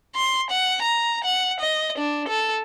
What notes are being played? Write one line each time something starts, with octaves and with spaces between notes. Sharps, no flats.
C6
F#5
A#5
F#5
D#5
D4
A4